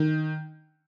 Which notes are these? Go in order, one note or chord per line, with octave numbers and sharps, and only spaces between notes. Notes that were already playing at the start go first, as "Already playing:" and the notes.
Already playing: D#3